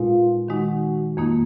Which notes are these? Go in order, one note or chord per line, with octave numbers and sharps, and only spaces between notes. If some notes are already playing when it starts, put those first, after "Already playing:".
Already playing: A#2 G#3 D#4 F4 G#4 B4
D#3 G#3 D#4 F#4
F2 D#3 A#3 D#4